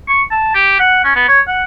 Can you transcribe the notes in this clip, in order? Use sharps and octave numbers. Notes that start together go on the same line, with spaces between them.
C#6
A5
G4
F#5
C#4
B3
C#5
F#5